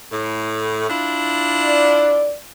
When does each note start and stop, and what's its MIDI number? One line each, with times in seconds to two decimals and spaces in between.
0.12 0.88 45
0.88 2.35 62
0.88 2.35 64
0.88 2.35 65
1.64 2.34 74